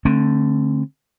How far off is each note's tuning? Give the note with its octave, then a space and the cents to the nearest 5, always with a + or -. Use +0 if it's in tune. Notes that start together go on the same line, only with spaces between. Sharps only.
D3 +0 A3 +0 C4 +35